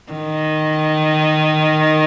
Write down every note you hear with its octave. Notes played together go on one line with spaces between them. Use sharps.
D#3